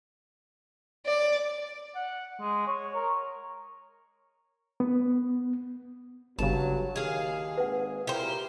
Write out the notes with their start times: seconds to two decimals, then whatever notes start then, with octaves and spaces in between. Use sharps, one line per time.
1.06 D5
1.95 F#5
2.41 G#3
2.67 C#5
2.95 A#4
4.80 B3
6.39 G1 G2 C#3 F#3 A5
6.96 D#2 G#4 F5
7.57 G#1 B4 F#5
8.07 A#2 E4 G4 A#4 C5